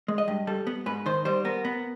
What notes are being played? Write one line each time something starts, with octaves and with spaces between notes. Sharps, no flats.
G#3
D#5
G2
G3 A4
B3
G#2 B4
D#3 C5
G3 C5
B3 A#4
B3